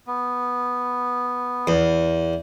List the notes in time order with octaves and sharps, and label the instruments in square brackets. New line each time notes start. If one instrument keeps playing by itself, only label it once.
[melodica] B3
[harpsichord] E2